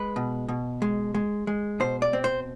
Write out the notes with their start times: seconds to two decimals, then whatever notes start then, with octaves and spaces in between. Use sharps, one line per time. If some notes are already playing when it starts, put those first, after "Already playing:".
Already playing: G#3 B4
0.16 B2
0.48 B2
0.82 G#3
1.14 G#3
1.47 G#3
1.80 B2 C5
2.02 D5
2.13 C4
2.24 C5